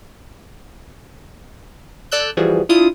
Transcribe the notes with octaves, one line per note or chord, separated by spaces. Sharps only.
A4 D5 E6 F#6 G6
E3 F3 G3 F#4 G#4
D4 E4 F4 D#6